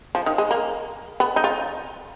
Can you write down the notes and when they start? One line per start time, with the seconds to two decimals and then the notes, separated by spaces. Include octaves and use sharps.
0.15 F3
0.26 D#3
0.38 G#3
0.51 A#3
1.20 B3
1.36 D#4
1.44 F4